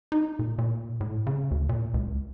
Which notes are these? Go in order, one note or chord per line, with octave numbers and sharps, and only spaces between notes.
D#4
A#2
A#2
A2
C#3
D2
A#2
C#2